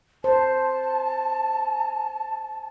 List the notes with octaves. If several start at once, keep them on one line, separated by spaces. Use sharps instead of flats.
C5 A5